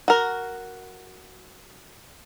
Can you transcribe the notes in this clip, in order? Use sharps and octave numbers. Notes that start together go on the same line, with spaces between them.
F#4 A#4